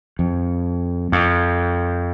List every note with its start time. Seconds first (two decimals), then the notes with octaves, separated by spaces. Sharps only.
0.19 F2
1.12 F2